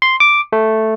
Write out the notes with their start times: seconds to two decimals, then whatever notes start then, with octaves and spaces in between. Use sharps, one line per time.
0.02 C6
0.20 D6
0.53 A3